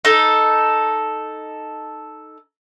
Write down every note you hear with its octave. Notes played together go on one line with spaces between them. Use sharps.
D#4 A4